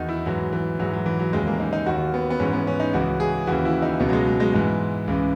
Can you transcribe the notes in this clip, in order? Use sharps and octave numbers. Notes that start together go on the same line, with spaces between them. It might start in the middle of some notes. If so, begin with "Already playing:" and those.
Already playing: E2 D#3 D#4 F#4
E4
G#2 E3 F#3
E3
G#2 E3 F#3
F#3
E3
F#3
D#2 C#3 E3 G#3
A#3
D#4
D#4
D#2 D#3 F#4
B3
B3
G#2 E3 C#4
B3
C#4
D#4
C#2 C#3 E3 F#4
G#4
D#2 C#3 E3 F#4
E4
D#4
C#2 B2 B3
F#3
G#3
F#3
G#3
G#2 E3 G#3
C#2 C#3 E3